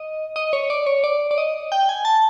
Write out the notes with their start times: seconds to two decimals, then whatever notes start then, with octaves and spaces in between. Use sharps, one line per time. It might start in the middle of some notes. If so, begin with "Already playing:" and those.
Already playing: D#5
0.36 D#5
0.53 C#5
0.70 D5
0.86 C#5
1.04 D5
1.31 D5
1.38 D#5
1.72 G5
1.89 G#5
2.05 A5